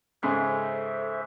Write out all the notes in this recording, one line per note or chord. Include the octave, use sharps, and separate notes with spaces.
G#2 C#3 G#3 A4 C5 E5